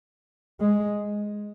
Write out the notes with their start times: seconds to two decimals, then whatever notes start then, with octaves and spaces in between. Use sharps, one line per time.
0.60 G#3